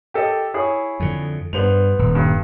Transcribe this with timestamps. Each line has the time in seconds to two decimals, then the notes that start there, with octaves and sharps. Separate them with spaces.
0.14 G4 A4 D#5
0.54 E4 G#4 C#5
1.00 F2 D3
1.53 G2 B3 C5 F7
1.99 D#1
2.15 G2